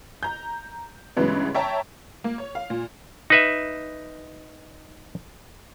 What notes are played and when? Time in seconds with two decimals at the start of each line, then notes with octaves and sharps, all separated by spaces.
0.23 A#5 G6
1.16 G2 C#3 E3 F#3 G#3 B3
1.54 C#5 E5 G5 A5 A#5
2.24 A#3
2.38 C#5
2.55 F5
2.70 A#2
3.30 D#4 B4 E5